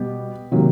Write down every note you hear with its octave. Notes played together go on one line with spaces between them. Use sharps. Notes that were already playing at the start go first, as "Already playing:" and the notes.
Already playing: B2 G3 B3 G4
C3 D#3 F#3 A#3